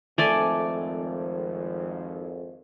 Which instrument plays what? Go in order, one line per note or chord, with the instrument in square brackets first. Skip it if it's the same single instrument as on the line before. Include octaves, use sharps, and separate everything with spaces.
[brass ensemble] G#1 F2 [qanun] A3 D5 G#5